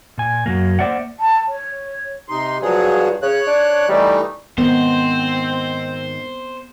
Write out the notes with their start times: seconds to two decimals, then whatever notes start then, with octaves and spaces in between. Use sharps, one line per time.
0.18 A#2 G#5
0.46 F#2 F#3 A#3
0.79 A#3 C5 D5 E5 F#5
1.20 A5
1.48 C#5
2.29 C3 D#4 C6
2.62 G2 F3 F#3 G#4
3.22 C#3 C#5 F#6
3.47 D4
3.88 E3 G3 A3 D#4
4.58 G#2 D#3 B3 C4 D#4 C5